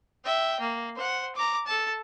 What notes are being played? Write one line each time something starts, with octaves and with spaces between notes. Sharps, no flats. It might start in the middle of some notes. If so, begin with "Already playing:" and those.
E5 G5
A#3
C5 F#5
A#5 D6
A4 A5